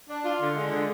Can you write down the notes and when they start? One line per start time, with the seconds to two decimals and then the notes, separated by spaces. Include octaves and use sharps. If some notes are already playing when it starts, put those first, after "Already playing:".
0.08 D4
0.24 F4
0.40 D3
0.55 G#3
0.71 D3